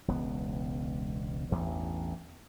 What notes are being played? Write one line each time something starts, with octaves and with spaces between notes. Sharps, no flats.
E1 C#2 B3
A1 E2 G2